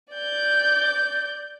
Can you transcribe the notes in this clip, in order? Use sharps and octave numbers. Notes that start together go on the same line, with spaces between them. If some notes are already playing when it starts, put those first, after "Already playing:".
D5 G6